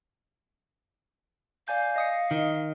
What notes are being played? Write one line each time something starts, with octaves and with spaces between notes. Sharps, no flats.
D5 F5 G#5 G6
D#5 D#6 C#7
D#3 D#5